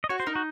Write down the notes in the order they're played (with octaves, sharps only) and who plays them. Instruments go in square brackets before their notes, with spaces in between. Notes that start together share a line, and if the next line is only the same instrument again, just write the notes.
[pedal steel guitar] D#5
[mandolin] F#4 [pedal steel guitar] C#5
[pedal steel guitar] C5
[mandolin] D#4 [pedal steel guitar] A#4
[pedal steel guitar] F#4